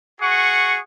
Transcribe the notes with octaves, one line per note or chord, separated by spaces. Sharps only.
F#4 G#4 F#5 C#6